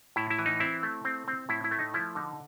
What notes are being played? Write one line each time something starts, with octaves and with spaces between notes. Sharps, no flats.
A2 E4
E4
E3
D#4
C4 E4
A3
C4
C4
A2 E4
E4
A3
D#4
F3 E4
D3 D#4